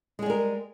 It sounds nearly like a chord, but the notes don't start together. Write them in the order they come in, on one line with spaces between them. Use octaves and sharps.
G#3 G#4 G3 A#4